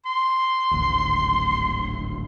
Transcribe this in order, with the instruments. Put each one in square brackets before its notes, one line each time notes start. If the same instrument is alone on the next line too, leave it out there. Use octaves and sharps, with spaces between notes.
[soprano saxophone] C6
[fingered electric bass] D1 G#1 D2